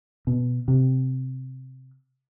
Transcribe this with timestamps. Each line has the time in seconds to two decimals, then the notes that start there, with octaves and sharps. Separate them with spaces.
0.27 B2
0.68 C3